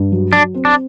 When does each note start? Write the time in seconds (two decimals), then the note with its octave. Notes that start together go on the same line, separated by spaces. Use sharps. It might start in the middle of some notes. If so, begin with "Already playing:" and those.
Already playing: G2
0.12 F#3
0.33 F#3 D4
0.54 C4
0.65 D4